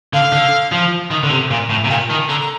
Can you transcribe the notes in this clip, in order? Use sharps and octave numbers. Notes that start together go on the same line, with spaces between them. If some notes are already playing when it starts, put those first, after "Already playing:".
D3 F5
D3
F3
D#3
D3
C3
A#2
A2
C3
A#2 G5
D#3 A5
D3 A#5
A#5